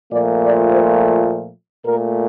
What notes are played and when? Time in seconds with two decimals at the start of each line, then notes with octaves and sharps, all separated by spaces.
0.11 A#2 F3 A3 D5
0.40 D5
0.69 C5
1.85 A#2 A3 A#4